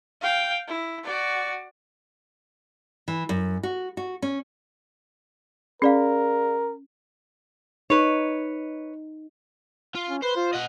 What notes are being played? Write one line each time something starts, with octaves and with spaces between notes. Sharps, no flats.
F5 G5
E4
F#4 D5
E3
F#2
F#4
F#4
C#4
C#4 G#4 A#4 D5 F5
D#4 B4 C#5
F4
C#4
B4 C5
F4
D#5 F#5